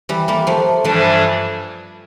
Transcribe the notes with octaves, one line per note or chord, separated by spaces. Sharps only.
E3 G3
G3 A#3
F3 A3
G2 E3 F3 G3 A3 D4